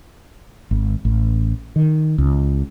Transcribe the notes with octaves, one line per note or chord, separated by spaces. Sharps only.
G#1
A1
D#3
C#2